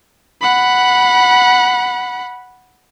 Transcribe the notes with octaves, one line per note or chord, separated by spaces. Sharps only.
F#5 B5